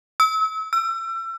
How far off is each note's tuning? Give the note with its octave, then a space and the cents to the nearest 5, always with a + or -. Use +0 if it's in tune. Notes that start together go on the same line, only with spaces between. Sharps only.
E6 -35
E6 +35